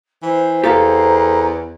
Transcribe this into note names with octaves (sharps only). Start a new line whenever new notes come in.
E3 C5
E2 G4 A4 F5 A#5